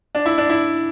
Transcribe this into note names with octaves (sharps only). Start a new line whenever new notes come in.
D4
E4
D4
E4